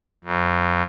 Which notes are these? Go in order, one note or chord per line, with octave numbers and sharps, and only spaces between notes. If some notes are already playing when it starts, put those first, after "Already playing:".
F2